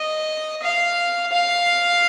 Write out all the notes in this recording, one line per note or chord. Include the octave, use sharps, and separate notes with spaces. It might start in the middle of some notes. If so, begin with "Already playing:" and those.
Already playing: D#5
F5
F5